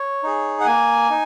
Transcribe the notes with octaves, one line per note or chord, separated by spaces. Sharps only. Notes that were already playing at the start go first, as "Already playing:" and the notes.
Already playing: C#5
D#4 G#4
F#5
A#3 G#5
D#4